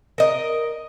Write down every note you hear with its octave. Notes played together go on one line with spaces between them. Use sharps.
A#4 D#5